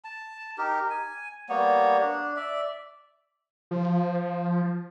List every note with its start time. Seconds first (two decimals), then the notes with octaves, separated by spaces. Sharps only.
0.04 A5
0.58 D#4 G4 A#4
0.90 G#5
1.49 G3 A#3 B3 C#5
2.00 D4
2.36 D5 E5
3.71 F3